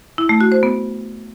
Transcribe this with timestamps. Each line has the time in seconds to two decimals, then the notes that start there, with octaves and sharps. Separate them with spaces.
0.18 E4
0.29 A3
0.41 F#4
0.52 C5
0.63 B3